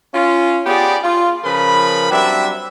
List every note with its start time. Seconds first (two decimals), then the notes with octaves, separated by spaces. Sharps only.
0.14 C#4 F4
0.66 B3 F4 G4 G#4 D5
1.03 F4
1.44 C#3 F3 A#4 B4 B5
2.10 F#3 G3 C4 D4 E5